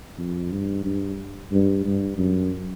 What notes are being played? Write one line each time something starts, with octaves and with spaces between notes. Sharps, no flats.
F2
G2
G2
G2
G2
F#2